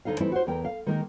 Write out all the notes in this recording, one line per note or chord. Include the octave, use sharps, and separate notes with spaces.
D2 E3 D#4 A4 F5
E3 G3 A3 C4 D#4 E4
F#4 C5
E2 A3 A#4 G5
F5
D#3 G#3 A#3 D#4 A#4